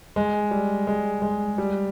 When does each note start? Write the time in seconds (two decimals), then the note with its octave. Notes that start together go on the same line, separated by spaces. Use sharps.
0.16 G#3
0.51 G3
0.87 G#3
1.22 G#3
1.58 G3